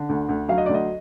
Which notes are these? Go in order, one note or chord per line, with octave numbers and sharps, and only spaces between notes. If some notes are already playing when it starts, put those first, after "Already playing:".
Already playing: D3
D2
D2
F#3 F5
D#5
D2 D5
D#5